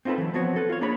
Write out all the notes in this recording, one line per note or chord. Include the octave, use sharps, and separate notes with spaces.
C4 D#4 F4 G#4 A4 B4
E3 F#3
F3 B3 C4 F#4 C#5
A4 B4
F4 C#5
A#3 D4 G#4 C#5 B5